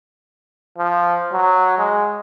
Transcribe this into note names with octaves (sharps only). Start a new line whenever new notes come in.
F3
F#3
G#3